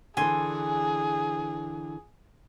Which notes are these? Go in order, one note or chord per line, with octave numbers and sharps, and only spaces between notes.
D3 E3 G#4 G#5 C6